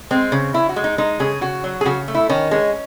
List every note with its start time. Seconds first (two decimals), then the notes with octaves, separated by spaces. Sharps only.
0.11 G#3 C4
0.32 C#3
0.54 C#3 E4
0.69 F#4
0.76 G#3
0.84 D#4
0.98 G#3 D#4
1.20 C#3 G#4
1.41 C#3 F#4
1.64 F#3
1.81 G#4
1.85 C#3 F#4
2.08 A3
2.14 E4
2.29 D#3 C#4
2.51 G#3 C#4